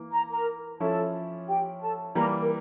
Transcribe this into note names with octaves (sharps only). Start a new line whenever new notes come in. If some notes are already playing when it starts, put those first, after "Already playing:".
Already playing: E3 A#3
A#5
A#4 A#5
F3 C#4 E4 A4 A5
G4 G5
A4 A5
E3 G3 A#3 A#4 A#5
A#4